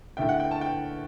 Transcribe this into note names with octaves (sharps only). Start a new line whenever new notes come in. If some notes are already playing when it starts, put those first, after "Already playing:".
D2 D3 A3 E4 G5
F#5
G5
A5
G5